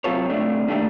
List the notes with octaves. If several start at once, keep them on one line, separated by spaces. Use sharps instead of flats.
C3 F#3 C4 F4 A4 C#5
C3 A3 D4
A#2 D#3 A3 D4 G4